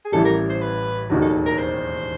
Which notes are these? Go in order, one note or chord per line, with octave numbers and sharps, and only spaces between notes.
G#4
A1 A2 E3 G3 A4
A#4
C5
B4
E1 D#2 D#3 F#3
A4
A#4
C5